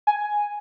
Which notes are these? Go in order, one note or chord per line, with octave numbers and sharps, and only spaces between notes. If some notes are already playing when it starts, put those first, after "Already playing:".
G#5